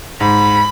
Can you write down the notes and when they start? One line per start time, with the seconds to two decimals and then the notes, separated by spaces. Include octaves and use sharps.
0.20 G#2 B5